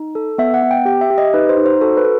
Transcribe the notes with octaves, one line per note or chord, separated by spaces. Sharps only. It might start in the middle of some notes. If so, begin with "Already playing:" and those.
Already playing: D#4
A4
B3 E5
F#5
B3
G5
G4 G5
E5
G4
D#5
D#4 B4
C5
D#4
C5
F#4 A4
B4
A4